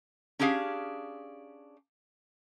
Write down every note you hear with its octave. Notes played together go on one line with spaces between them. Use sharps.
C#4 D4 G4 G#4 F5